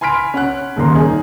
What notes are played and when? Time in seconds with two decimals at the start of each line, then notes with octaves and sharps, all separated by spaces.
0.01 G#5 B5 C6 F6 B6 D7
0.34 C#4 F#5 F#6
0.76 D#1 D#2 D#3 A#5 C6
0.95 C#4 D#4 G#4